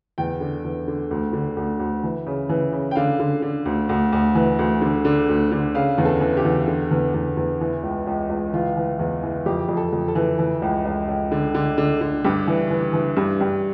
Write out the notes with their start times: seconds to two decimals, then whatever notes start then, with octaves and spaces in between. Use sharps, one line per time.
0.18 E2 G5
0.41 D3
0.64 E2
0.88 D3
1.11 D2
1.33 D3
1.56 D2
1.80 D2
2.03 E3
2.27 C#3
2.49 E3
2.72 C#3
2.91 G5
2.96 D3 F5
3.20 D3
3.42 D3
3.65 D2
3.89 D2
4.12 D2
4.35 E3
4.59 D2
4.82 D3
5.05 D3
5.29 D2
5.52 D3
5.75 C#3 F5
5.98 E2
6.05 A4
6.21 E3
6.37 G4
6.45 E2
6.68 D3
6.91 E2
7.14 E2
7.37 E2
7.61 E3
7.83 C#2
8.07 C#2
8.30 C#2
8.53 E3 F4
8.77 E3
8.99 E2
9.23 E3
9.46 F2 G4
9.69 F2
9.77 A4
9.93 F2
10.08 A4
10.15 E3
10.39 E3
10.62 C#2
10.85 C#2
11.08 C#2
11.32 D3
11.55 D3
11.78 D3
12.01 D3
12.24 G2 G4
12.48 E3
12.71 E3
12.93 E3
13.17 G2
13.41 G2